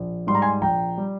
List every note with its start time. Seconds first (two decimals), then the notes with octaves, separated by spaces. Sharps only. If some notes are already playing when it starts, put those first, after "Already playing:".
Already playing: A#1
0.27 G#2 G3 C6
0.35 A#5
0.42 G#5 C6
0.61 A#1 G5 A#5
0.97 G3